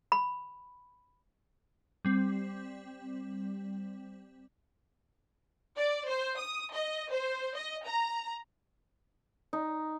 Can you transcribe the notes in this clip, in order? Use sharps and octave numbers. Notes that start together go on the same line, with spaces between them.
B5
G3 C4
D5
C5
D#6
D#5
C5
D#5
A#5
D#4